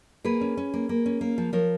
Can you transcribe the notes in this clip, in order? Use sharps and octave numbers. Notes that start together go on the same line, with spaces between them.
A#3 G#4 B4
C#4
C#4
A#3
A#3
C#4
A#3
F3
F3 A#4 C#5